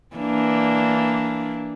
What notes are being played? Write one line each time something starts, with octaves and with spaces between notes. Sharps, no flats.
E3 A#3 D4